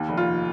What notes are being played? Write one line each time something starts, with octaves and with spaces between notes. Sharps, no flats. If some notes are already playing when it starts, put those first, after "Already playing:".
Already playing: D#2
F1
F4
F1